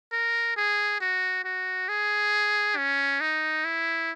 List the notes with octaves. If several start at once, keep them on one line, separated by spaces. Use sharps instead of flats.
A#4
G#4
F#4
F#4
G#4
C#4
D#4
E4